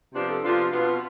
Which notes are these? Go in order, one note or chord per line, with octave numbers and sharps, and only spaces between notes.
C3 F3 B3 D4 F4 G4
A4
C3 F3 B3 D4 F4
B2 B3 F4